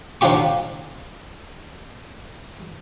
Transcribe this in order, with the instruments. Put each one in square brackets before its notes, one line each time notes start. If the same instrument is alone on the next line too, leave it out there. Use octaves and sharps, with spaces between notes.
[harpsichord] D3 F3 D#4 F4 G4 C#6